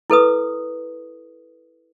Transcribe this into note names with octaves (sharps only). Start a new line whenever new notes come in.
E4 A4 B4 D#6